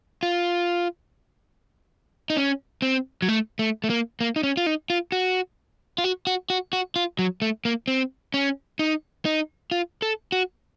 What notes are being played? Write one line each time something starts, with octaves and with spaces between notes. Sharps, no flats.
F4
D#4
C#4
C4
F#3
A3
A3
A3
A#3
A#3
D#4
C#4
F4
D#4
F4
F#4
F4
F#4
F#4
F#4
F#4
F4
F#3
A3
A#3
C4
C#4
D#4
D#4
F4
A4
F#4